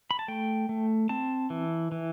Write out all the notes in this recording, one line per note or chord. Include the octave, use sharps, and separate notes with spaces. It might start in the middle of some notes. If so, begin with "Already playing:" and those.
B5
A5
A3 G5
A3
C4 A5
E3
E3